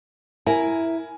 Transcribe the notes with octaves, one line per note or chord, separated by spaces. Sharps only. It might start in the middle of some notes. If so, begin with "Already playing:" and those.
E4 A#4 G#5